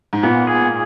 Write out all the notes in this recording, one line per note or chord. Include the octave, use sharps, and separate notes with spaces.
G#2
A#2 B3
G#4